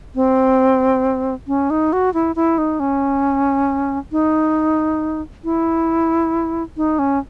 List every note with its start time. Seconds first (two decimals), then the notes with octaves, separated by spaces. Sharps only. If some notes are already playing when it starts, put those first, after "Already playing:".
0.15 C4
1.48 C#4
1.70 D#4
1.93 F#4
2.14 E4
2.36 E4
2.58 D#4
2.80 C#4
4.12 D#4
5.44 E4
6.77 D#4
6.99 C#4